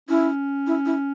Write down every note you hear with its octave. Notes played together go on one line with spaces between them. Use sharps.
C#4 E4
E4
E4